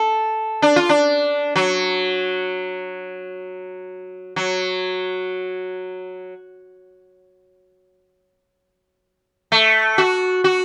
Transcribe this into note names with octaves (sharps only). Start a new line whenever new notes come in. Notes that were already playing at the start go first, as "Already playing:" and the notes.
Already playing: A4
D4
F4
D4
F#3
F#3
A3
F#4
F#4